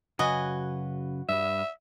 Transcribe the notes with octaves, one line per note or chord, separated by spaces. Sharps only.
F#2 C#3 F#4 B4 D#5 G#5
G2 G3 E5